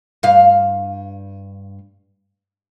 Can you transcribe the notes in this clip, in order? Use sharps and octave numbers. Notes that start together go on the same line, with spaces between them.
G2 F5